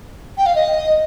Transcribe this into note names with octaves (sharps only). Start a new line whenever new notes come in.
G5
F5
D#5